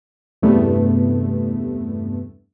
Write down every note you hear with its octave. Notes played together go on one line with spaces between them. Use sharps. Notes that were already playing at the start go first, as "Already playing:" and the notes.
E2 G2 C3 A3 B3